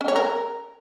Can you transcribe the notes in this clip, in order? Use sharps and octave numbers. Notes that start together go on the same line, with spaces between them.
C#4
C#5
A#4